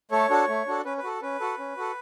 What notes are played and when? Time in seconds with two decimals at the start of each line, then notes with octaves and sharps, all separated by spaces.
0.11 A3 A4 C#5
0.30 D4 F#4 A4
0.48 A3
0.67 D4 F#4 A4
0.85 C#4 B4
0.98 B4
1.04 F#4 A4
1.22 C#4 B4
1.40 F#4 A4
1.59 C#4
1.77 F#4 A4